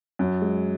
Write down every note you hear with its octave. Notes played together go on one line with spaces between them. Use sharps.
F#2
G#3